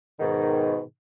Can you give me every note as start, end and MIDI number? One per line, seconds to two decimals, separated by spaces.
0.19 0.79 44
0.19 0.79 47
0.19 0.79 51